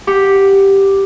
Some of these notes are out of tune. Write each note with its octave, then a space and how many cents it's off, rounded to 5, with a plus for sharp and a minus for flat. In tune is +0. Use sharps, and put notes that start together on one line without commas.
G4 +0 F#5 +0